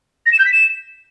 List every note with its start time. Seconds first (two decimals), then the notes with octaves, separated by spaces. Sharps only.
0.26 A#6
0.33 E7
0.39 G6
0.46 B6
0.52 E7